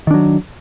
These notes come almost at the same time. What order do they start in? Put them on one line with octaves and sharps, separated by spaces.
D#3 D4 F#3